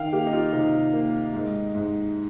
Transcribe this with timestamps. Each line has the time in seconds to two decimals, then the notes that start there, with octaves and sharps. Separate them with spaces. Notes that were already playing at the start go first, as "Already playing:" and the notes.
Already playing: D#3 F5 G5
0.12 A#3 G4
0.27 D#4
0.33 F4
0.53 C3 D#4
0.93 A#3
1.34 G#2
1.74 G#2